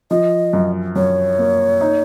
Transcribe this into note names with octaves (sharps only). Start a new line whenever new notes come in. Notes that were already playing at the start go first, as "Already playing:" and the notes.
F3 D#5
F#2
F#2 C#5
A#3
D#4